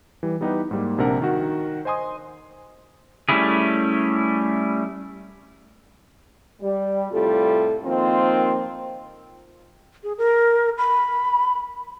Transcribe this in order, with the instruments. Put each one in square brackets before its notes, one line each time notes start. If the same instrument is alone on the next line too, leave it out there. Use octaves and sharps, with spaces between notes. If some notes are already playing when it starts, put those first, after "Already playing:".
[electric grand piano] E3 G3
G3 B3 D#4 E4 G4 B4
G#2 G3 A#3
A#1 C3 D4 A#4 F#5
D#3 F#4
C5 D#5 G#5 C6 D#6
[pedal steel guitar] G3 A3 C#4 E4 G#4
[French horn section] G3
A2 C3 G3 F4 A4
D#3 F3 A#3 C4 F4
[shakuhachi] G#4
A#4
B5